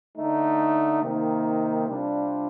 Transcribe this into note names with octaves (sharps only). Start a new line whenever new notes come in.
D3 A3 D#4
C3 D#3 A#3 D#4
C3 G3 D4 F4